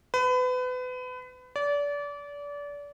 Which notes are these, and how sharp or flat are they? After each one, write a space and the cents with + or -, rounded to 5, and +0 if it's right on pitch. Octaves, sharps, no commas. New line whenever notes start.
B4 +30
D5 -30